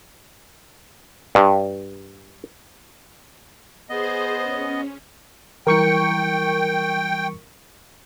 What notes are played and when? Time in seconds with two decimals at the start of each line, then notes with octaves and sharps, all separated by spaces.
1.35 G2
3.89 B3 G#4 C5 D#5
4.43 C#4
5.67 E3 G3 E4 A#4 G5 C#6 C#7